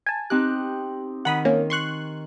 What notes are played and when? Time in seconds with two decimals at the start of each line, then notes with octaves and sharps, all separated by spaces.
0.06 G#5 A5
0.30 C4 D#4 G4 F#6
1.25 D#3 F#5 B5 D#6
1.45 A#3 C#4
1.70 C6 C#6 F#6